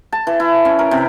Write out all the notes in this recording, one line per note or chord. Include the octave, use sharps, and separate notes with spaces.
A5
E3
E4
C#4
A#4
C3